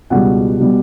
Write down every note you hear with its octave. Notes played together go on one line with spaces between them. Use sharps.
C#2 B2 G3 F#5
B2 G3